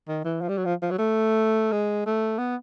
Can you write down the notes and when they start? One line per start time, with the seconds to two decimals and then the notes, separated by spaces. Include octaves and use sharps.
0.08 D#3
0.25 E3
0.41 F3
0.49 G3
0.58 F#3
0.65 F3
0.82 F3
0.91 F#3
0.98 A3
1.72 G#3
2.06 A3
2.39 B3